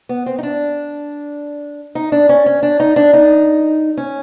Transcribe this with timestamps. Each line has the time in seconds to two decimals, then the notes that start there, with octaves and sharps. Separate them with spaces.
0.09 B3
0.26 C4
0.38 D#4
0.43 D4
1.95 D#4
2.12 D4
2.29 C#4
2.46 C#4
2.63 D4
2.80 D#4
2.96 D4
3.13 D#4
3.97 C#4